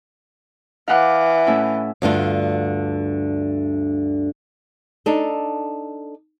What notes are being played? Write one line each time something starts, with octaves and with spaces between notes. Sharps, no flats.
E3 F5 F#5 D6
A2 C#4 E4
D2 G2 D3 F4
D4 D#4 A4